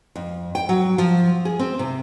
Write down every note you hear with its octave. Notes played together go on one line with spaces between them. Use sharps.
F2
G5
F#3
F3
G#4
C4
C3